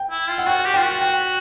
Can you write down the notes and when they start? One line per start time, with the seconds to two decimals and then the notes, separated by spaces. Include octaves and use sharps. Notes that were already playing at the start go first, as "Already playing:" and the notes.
Already playing: G5
0.11 E4
0.29 F4
0.38 F#5
0.47 F#4 G5
0.65 G4
0.74 F4 G5
0.83 F#4
1.01 G5